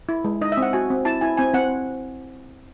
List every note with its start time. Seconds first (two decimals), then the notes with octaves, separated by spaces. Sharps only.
0.09 E4
0.25 G#3
0.41 D#4 D#5
0.52 E5
0.57 C4
0.62 F#5
0.73 F#4 G#5
0.90 C4
1.05 E4 A5
1.21 E4 G#5
1.37 C4 G#5
1.54 C4 F#5